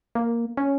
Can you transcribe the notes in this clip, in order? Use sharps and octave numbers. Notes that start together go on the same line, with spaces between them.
A#3
C#4